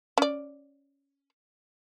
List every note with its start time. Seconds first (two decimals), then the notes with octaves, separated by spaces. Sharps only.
0.18 C#4 D5